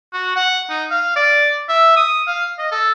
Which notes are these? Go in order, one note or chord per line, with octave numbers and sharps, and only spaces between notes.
F#4
F#5
D#4
F5
D5
E5
D#6
F5
D#5
A4